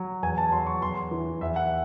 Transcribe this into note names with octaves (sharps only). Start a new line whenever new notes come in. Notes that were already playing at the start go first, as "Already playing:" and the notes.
Already playing: F#3
E2 G#5
A5
F#3 C6
C#6
E2 C6
E3
E2 E5
F#5